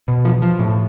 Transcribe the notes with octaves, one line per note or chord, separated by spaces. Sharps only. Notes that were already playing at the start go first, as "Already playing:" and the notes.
B2
F3
F3
A2